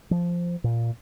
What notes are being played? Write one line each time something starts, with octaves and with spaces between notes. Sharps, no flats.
F3
A#2